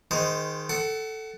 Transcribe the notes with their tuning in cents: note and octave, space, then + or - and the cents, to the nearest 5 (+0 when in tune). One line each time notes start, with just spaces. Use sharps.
D#3 +0 G#3 +0 C5 -30
A4 +0 F#5 +30